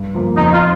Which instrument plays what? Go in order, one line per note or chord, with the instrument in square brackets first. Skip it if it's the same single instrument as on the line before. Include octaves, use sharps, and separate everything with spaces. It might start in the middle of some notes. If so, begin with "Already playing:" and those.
Already playing: [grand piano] G2
F3 A#3
[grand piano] F2 [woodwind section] D#4
[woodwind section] F4